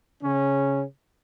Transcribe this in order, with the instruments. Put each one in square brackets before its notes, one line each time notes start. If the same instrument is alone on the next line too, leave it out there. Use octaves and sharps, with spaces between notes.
[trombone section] C#3 C#4